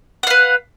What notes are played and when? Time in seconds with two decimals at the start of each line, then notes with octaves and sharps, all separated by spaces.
0.23 F#5
0.27 F5
0.30 B4